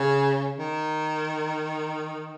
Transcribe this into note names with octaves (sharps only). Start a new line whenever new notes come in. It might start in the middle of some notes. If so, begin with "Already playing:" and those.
Already playing: C#3
D#3